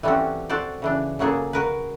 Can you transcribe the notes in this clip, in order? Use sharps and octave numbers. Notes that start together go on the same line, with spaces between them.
E3 G3 A3 C4 C#4 F#4
F#4 A4 C5 D5
C#3 E3 D4
C#3 F#3 A#3 G#4 A4
F#4 A#4 B4